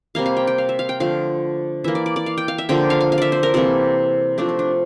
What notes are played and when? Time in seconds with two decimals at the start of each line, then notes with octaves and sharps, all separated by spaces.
0.15 C3 G3 A#3 F5
0.26 F5
0.37 G5
0.47 G5
0.58 F5
0.69 E5
0.79 F5
0.89 G5
1.00 D3 F3 A3 F5
1.84 E3 A#3 E5
1.95 D5
2.06 D5
2.16 D5
2.26 F5
2.38 G5
2.48 F5
2.58 E5
2.69 D3 F3 A#3 G5
2.90 F5
3.00 F5
3.12 F5
3.18 D5 E5
3.32 C5
3.43 A#4
3.54 C3 E3 A#3 A4
4.38 C3 F3 A3 D4
4.49 D4
4.59 D4